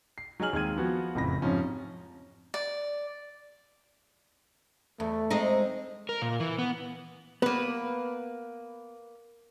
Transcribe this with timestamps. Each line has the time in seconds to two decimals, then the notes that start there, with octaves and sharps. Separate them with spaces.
0.18 C7
0.40 F#3 D#4 G#4 G#5 F6 F#7
0.53 D#2 G#3 C4 F6 G#6 D#7
0.76 F3 B3 F#4
1.14 F#1 F2 A2 B5 A#6
1.42 F2 G#2 C3 F3 C#4
2.54 D5
5.00 E2 A3
5.30 G#3 C4 D#4
6.09 A#4
6.22 A#2
6.40 E3
6.59 B3
7.42 A#3 B3 B4